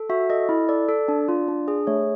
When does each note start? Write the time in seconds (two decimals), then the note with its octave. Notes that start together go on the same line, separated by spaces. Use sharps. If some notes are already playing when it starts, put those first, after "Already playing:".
Already playing: A4
0.09 F#4 E5
0.30 A4 D#5
0.49 E4
0.69 A4 D5
0.89 A4
1.08 D4
1.28 F4
1.48 D4
1.68 G#4
1.87 A3 C#5